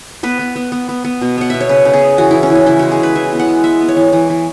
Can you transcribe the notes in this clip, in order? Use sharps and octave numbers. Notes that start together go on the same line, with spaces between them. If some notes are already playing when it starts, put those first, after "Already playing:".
B3 B4
B3
B3
B3
B3
B3
B2
B3 F#5
B2 E5
C#5
C#3 B4
C#3
G#4
B3
E3 F#4
E3 E4
C#4
E3
C#4
C#3 E4
G#3 F#4
G#4
C#3 B4
E3 E5
B3
F#5
G#3
B3 E5
B3
C#5
E3
E3
E3